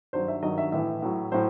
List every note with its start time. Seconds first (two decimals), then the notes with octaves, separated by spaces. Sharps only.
0.13 G2 D#3 F#3 C5
0.28 E5
0.43 G2 D#3 F#3 D#5
0.58 E5
0.72 A2 E3 E5
1.02 A2 F#3
1.32 A2 F#3 C5